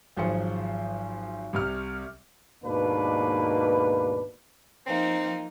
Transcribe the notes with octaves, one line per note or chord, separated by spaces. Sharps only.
G#1 F3 F#3 G#4 C5 C#7
C2 C3 F6
D#2 G#2 B2 A#3 D4 B4
F3 A#3 C4 D#4